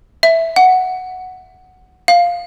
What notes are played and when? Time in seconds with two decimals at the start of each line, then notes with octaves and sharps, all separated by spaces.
0.23 E5
0.56 F#5
2.08 F5